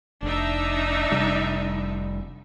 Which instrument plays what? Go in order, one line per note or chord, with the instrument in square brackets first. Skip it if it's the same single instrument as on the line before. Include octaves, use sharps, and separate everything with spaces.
[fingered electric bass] F1 [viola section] D4 D#4 E5
[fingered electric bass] F1 C3 G3